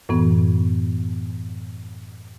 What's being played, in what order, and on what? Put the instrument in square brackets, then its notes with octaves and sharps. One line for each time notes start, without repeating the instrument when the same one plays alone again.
[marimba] F#2 A2 E3 B3